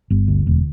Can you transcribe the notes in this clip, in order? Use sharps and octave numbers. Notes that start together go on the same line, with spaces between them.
G1
D2
E1